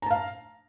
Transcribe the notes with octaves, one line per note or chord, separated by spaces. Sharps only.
F5 A5 A#5